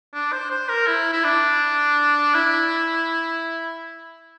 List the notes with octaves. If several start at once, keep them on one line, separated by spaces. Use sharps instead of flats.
D4
C5
C5
A#4
E4
E4
D4
E4